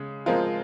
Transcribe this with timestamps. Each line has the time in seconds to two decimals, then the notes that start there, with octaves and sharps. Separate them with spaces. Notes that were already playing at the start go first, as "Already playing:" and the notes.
Already playing: C#3 G#3
0.26 F3 G#3 C4 F4 A#4